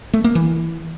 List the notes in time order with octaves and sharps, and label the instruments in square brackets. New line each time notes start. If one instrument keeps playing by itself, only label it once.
[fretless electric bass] A3
A#3
E3